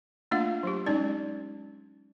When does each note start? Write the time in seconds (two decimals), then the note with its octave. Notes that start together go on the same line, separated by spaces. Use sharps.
0.31 A3 A#3 D4 F4 F5 F#5
0.63 F#3 G4
0.86 G#3 C#4 D#4 D5